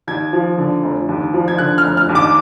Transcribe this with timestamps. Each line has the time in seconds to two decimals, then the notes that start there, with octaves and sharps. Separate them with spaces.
0.07 D#2 G#6
0.33 F3
0.58 D3
0.83 F1
1.09 D#2
1.34 F3
1.48 G#6
1.58 D3 F#6
1.78 F6
1.85 F1
1.97 F6
2.09 D#2
2.15 D6